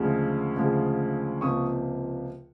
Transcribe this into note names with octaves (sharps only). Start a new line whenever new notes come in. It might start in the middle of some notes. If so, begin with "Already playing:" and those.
Already playing: D2 C#3 F3 G#3
D2 C#3 F3 G#3
C#2 C3 F3 A#3 C#6 D#6